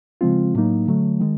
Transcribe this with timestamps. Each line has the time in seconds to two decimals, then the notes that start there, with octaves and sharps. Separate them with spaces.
0.21 C#3 F3 G#3 C4 F4
0.55 A2 F#3 A#3 D#4
0.87 D3 F#3 A3
1.20 D#3 G#3